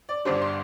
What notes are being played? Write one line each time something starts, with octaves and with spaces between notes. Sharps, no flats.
D5
G1 G2 G3 D4 C5
C6